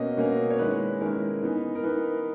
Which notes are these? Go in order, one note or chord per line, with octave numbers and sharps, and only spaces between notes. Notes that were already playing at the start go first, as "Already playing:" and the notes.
Already playing: B2 A#3 C#4 D#5
B2 A#3 C#4
C#5
D#3 G#3 C#4 E4 B4
D#3 G#3 C#4 E4 A#4
E3 B3 D#4
A#4
E3 B3 D#4 B4